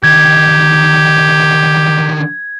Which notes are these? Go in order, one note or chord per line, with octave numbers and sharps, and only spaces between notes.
D3 D#3 G4 G#6